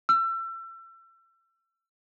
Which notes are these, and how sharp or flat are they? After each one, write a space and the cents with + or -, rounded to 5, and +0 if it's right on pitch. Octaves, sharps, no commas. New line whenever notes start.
E6 +35